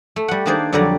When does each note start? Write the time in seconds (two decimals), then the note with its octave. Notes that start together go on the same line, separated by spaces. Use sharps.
0.16 A3
0.28 G3 F#5
0.46 D#3 A#3 D4 G#4 C5 D5
0.72 F2 D3 F#3 G3 D5 A#5